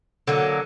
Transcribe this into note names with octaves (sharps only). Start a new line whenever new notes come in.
D3 F#3 A#3